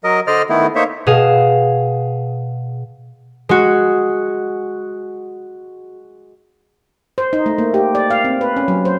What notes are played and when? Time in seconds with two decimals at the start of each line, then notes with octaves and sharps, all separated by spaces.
0.04 F#3 A#4 D#5
0.27 D3 C5 D5 D#5 F6
0.49 D#3 A3 B3 E4
0.75 A#3 D#4 C5 C#5 E5
1.07 B2 G#4 F5 E7
3.49 G#3 F#4
7.18 C5
7.33 D#4
7.46 A3
7.58 A#3
7.74 G4
7.95 D5
8.11 F5
8.25 C4
8.41 B4
8.56 C#4
8.68 F#3
8.85 C5